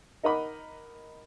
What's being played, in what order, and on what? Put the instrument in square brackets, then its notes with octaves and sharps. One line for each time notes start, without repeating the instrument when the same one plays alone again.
[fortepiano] D#4 A#4 D#5 F#5 B5 D6